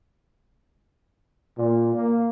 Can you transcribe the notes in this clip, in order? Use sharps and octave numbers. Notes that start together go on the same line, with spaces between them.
A#2
A#3